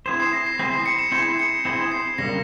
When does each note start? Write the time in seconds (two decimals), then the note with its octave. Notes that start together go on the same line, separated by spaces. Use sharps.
0.06 C4 E4 G#4 C5 E7
0.20 C7
0.33 A#6
0.46 C7
0.59 C4 E4 G#4 C5 A#6
0.72 C7
0.86 C#7
0.99 E7
1.12 C4 E4 G#4 C5 C#7
1.39 C#7
1.65 C4 E4 G#4 C5 E7
1.92 C7
2.18 C#3 G3 A#3 A#6